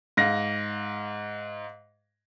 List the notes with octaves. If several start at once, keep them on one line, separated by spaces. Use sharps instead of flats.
G#2 F5 A#6